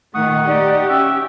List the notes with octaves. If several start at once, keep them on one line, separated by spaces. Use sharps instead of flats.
A#2 D#3 A3 F#5 C#6 D#6
D#4 G4 D5
C#4 E5 G5 E6